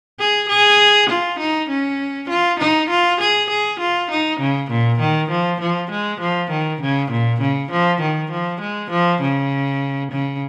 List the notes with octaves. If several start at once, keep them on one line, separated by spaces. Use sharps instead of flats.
G#4
G#4
F4
D#4
C#4
F4
D#4
F4
G#4
G#4
F4
D#4
C#3
A#2
D#3
F3
F3
G#3
F3
D#3
C#3
A#2
C#3
F3
D#3
F3
G#3
F3
C#3
C#3